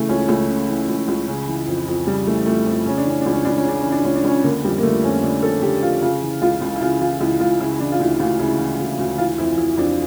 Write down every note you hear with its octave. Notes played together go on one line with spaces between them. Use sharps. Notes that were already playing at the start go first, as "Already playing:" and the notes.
Already playing: C#3 E3 A3
C#2 C#4
C#2 A3
C#3
E3
C#2
C#2
C#3
E3
F2
F2
C#3 G3
E3 A3
F2 A3
F2
C#3 C#4
D4
E3 C#4
C#2 D4
C#4
C#2 D4
C#4
C#3 D4
C#4
E3
D4
C#2 C#4
D4
C#2 C#4
D3 A#3
F2 G3
A#3
D3 A3
F2 C#4
D3 D4
F2 A4
D3 G4
F2 F4
C#3 F4
E3
C#2 F4
C#2
E4
C#3 F4
E3 F4
C#2 E4
C#2 F4
C#3 E4
E4
E3 D4
F4
D2 E4
D2 F4
C#3 E4
E3
D2
D2
E3 F4
F2 E4
E3 E4
F2 D4